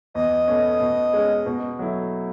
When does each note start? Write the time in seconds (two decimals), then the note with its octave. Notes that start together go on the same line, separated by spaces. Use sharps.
0.14 E2 D#5
0.48 B2 A3 C#4
0.81 B2
1.13 G#3 C#4
1.46 B2
1.79 F#3 A3 E4